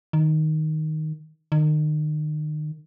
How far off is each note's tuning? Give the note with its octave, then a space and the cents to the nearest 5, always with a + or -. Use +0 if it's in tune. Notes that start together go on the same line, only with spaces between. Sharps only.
D#3 +0
D#3 -35